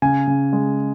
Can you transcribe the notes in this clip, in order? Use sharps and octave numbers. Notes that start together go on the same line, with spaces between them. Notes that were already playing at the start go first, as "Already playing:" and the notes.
C#3 G#5
C#3
G#3